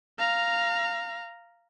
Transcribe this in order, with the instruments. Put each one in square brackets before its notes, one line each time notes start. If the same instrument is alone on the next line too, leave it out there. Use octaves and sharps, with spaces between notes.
[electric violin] F5 A#5